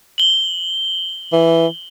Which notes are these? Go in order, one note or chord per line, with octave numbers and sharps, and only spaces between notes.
F#7 G7
E3